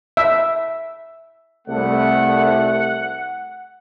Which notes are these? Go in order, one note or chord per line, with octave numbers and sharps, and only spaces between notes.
E5
C2 A3 F#5